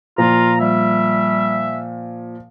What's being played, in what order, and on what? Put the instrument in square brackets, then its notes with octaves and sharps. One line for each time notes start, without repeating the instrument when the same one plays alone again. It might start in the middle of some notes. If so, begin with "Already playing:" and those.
[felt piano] A#2 F3 [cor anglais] F4 [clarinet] A#5
[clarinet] G3 [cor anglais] E5